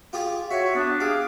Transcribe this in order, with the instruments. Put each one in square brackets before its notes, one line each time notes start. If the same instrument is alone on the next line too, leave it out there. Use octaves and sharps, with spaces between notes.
[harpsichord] F4 G4 G#4
[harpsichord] F#4 [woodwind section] C#5 E5 C#6
[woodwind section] B3 D4
[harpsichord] G4 [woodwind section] G#4 F5 D6